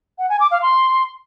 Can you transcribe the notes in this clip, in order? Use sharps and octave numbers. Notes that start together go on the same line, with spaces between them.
F#5
G#5
D6
F5
C6